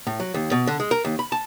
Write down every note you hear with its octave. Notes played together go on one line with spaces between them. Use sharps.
A2
F#3
D#2
B2
D3
G#3
A#4
D#2
B5
A5